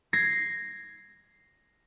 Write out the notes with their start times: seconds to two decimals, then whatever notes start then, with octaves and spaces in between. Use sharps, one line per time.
0.13 G#6 A#6 C7